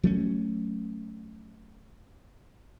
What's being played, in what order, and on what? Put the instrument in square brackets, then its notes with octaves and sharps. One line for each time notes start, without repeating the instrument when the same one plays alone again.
[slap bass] F#3 A3 C#4